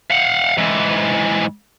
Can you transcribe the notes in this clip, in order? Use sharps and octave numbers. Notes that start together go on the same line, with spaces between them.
F5 F#5
G#2 E3